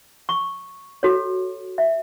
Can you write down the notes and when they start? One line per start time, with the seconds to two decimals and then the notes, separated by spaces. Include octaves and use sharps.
0.29 C#6
1.03 F#4 A4 C#5
1.78 E5